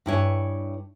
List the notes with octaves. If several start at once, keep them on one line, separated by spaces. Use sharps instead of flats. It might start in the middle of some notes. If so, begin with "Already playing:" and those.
G2 E4 C#5 G#5